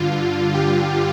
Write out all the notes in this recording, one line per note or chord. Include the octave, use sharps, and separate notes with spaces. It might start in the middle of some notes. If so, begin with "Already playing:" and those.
Already playing: G2 D3 F4
G4